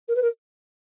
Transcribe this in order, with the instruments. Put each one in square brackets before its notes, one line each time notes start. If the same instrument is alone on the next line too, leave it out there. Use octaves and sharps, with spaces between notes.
[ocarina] A#4
B4
A#4